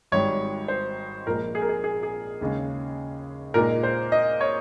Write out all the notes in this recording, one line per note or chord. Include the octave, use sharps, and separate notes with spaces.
G#1 G#2 G3 C#5
C5
A#1 A#2 G#3 A#4
G#4
A#4
G#4
G#4
G#4
D#2 C#3 G#3 C#4
A#2 G#3 D#4 A#4
C5
D#5
C#5